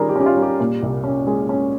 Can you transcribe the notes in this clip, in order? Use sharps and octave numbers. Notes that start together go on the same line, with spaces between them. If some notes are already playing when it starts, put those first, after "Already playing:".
Already playing: D#3 G3 C#4 F4 G#4 A#4
G4
C#4
G4
F4
G3
G4
A#2
C2
C#4
G#3
C#4